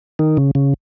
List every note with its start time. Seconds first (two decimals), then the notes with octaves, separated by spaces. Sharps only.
0.19 D#3
0.37 C#3
0.55 C#3